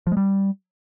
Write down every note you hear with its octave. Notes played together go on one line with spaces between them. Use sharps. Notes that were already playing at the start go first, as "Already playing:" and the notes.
F3
G#3
G3